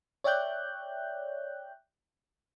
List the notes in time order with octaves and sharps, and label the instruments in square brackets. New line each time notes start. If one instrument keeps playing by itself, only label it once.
[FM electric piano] C#5 D5 E5 G5 F#6 G6